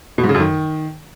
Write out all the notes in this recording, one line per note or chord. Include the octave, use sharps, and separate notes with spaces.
B2
G#2
C#3
F#2
D#3